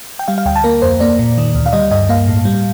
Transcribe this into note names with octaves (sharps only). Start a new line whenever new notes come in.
G5
G3 F5
F5
D2 G5
A5
A#3 A#4
F2 C5
A#3 D5
A#2
D#3
D2
F5
G3 D#5
G2 D#5
A#3 F5
A2
G3